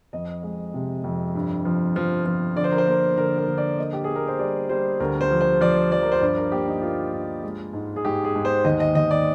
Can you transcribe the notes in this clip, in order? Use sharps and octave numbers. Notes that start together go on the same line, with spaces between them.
F2 D#5
G#3
C3
F2
G2
F3
F3
F3
D3 D5
C5
A#4
C5
A#3 A#4
D3 A#4
A#4
D3
D5
A#3 D#5
G4
G#4
A#3
A#4
C5
G3 D5
G3 C5
D2 A#4
C5
F3
C5
F3 D5
F3 D5
A#4
C5
G2 D5
A#4
A#3 G4
D#4
A#3 F4
G2
G#3
G#2
G#4
G#2 G4
G#4
G#2
C5
D#2 D#5
D#5
D#2 D#5
D5